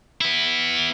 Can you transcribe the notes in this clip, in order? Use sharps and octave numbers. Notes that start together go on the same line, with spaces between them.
B3 E4